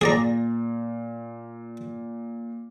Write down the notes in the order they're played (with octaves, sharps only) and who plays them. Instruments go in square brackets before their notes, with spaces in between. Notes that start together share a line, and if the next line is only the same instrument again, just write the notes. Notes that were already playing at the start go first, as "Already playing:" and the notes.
[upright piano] A#2 [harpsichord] G#4 D5 A#5